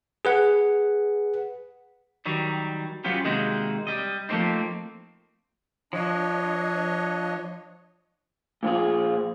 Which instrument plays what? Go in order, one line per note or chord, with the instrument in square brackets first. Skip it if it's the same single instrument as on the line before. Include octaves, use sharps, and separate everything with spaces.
[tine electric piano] G#4 B4 F#5
[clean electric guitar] D#3 F#3 G3
F#3 B3 C#4 F4 G4
C3 D#3 G#3 A#3 D#4 F#4
G3 D#5
F3 A3 A#3 C4 D#4
[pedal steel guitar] F3 [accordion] D4 C#5 D#5
[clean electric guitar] A#2 F3 F4 G#4